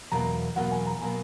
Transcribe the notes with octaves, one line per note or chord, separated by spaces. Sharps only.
E2 B2 F#3 A#3 A#5
E2 B2 F#3 A#3 F#5
G#5
A#5
B2 F#3 A#3 G#5